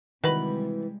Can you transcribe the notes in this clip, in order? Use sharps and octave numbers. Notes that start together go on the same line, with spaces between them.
C3 D#3 E3 G3 G#3 F#4 B4 B5